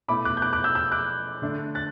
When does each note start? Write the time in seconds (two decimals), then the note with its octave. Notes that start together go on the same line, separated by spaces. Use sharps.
0.08 B2 A3 E4 B5 D6
0.25 D6 F#6
0.37 G6
0.42 D6 F#6
0.53 D6 F#6
0.64 E6 G6
0.75 E6 G6
0.92 D6 F#6
1.42 D3 A3 D4
1.75 F#6 A6